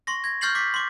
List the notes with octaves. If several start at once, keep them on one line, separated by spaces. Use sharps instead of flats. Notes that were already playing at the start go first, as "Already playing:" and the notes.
C6 C#6 A#6
G#6 A#6
C#6 F6 G6 A6 C7 F#7
D6 B6 C7
C6 D6